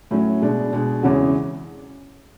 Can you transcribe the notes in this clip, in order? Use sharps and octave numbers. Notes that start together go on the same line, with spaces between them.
A2 F#3 C#4
B2 G#3 D4
B2 G#3 D4
E2 C#3 G#3 C#4 F#4